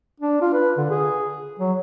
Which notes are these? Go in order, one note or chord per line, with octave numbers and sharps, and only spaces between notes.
D4
F4
B4
D3
G#4
F#3